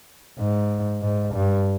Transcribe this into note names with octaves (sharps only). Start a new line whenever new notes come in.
G#2
G#2
G2